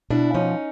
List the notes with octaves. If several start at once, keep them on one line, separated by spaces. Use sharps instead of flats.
B2 D4 E4
F3 C#4 D#4